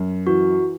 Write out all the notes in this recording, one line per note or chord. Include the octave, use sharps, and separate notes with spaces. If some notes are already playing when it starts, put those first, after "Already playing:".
Already playing: F#2
E3 F#4